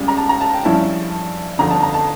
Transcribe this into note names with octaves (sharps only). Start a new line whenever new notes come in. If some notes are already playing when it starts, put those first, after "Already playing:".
Already playing: C#2 C#3 G3
A#5
A5
A#5
A5
G5
G2 F3 C#4 E4 A5
G1 F2 D3 A#5
A5
A#5
A5